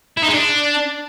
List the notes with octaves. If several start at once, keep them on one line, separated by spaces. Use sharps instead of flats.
E4
D#4
G#3
D4